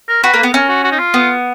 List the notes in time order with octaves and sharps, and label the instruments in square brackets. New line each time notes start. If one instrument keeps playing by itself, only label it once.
[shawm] A#4
[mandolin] F#4 [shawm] B4
[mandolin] A#3
B3
[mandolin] C#4 [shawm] A#4
[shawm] F#4
F#4
D#4
F4
[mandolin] B3